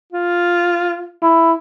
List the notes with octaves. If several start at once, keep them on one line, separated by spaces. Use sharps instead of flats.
F4
E4